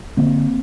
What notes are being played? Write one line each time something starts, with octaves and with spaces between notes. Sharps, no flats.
D3 A#3 C4